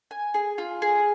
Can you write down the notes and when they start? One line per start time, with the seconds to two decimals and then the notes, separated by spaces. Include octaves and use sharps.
0.11 G#5
0.34 G#4
0.58 F4
0.82 G#4